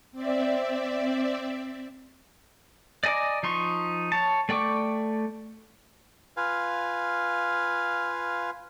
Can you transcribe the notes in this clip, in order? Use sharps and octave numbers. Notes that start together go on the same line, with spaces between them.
C4 D5 E5
D5 D#5 G#5 A#5 D6
F3 D#4 C6 C#6
C#5 A5
A3 D5 G5 C#6 D6
F4 B4 F5 G#5